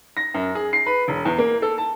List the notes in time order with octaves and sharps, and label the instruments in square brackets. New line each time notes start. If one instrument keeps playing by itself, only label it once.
[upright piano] A#6
F#2
G#4
C7
B4
E1
E2
A#3
A4
A5